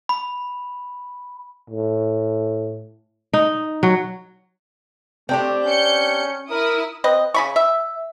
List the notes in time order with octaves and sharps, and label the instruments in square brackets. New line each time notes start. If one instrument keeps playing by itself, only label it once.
[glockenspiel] B5
[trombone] A2
[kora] D#4
F#3
[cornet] A3 [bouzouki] C4 D4 G4
[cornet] C#4 [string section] G6 C#7
[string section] E4 D#6 [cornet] A#4
[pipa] C4 B4 D#5
C#3 B5 C#6
E5